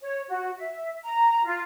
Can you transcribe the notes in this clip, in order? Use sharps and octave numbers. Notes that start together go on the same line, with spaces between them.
C#5
F#4
E5
A#5
F4